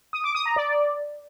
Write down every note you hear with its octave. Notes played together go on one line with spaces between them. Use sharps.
D#6
D6
D#6
A#5
D5